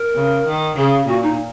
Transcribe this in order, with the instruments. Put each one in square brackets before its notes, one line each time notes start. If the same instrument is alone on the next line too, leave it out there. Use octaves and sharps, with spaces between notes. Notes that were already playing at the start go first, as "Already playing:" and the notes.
Already playing: [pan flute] A#4
[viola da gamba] C#3
D#3
[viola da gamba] C#3 [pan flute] G#4
[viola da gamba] A#2 [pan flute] F#4
[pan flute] D#4